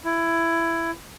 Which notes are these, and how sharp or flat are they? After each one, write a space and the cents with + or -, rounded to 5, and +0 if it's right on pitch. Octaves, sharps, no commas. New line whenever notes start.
E4 +15